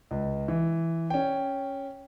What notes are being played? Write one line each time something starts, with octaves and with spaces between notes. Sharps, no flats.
C#2
E3
C#4 G5